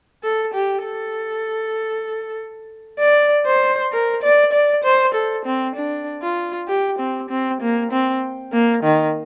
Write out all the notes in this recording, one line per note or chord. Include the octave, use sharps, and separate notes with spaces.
A4
G4
A4
D5
C5
A#4
D5
D5
C5
A4
C4
D4
F4
G4
C4
C4
A#3
C4
A#3
D#3